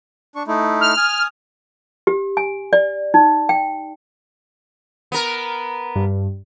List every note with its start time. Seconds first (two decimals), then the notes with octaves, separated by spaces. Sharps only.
0.36 D4 C#6
0.47 A3 D#4 E4
0.81 F6
0.97 G#5 D#6
2.07 G4
2.37 G#5
2.73 D5
3.14 D#4
3.49 G5
5.12 B3 A#4
5.95 G2